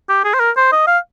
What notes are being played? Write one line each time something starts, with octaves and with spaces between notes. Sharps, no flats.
G4
G#4
C5
A#4
C5
D#5
F5